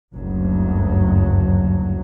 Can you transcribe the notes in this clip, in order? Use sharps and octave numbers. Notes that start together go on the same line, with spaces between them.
F#1 D2 G2 F#3